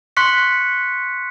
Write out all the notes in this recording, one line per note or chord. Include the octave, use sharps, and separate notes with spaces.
C6 C#6 F#6 B6 C#7